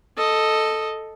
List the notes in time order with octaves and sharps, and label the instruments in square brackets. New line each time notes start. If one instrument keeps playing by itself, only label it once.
[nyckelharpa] A4 D#5